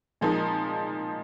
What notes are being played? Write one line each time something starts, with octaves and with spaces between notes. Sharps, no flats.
A#2 F3 G#3 D#4